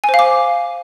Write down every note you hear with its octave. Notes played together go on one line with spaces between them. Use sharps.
G#5
C5
F5
D6